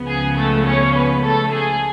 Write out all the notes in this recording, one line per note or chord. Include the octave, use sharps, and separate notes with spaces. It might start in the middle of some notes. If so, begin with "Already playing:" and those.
Already playing: C#2 C#3 F3 B3
G#4
A3 A4
C#4 C#5
B3 B4
A3 A4
G#4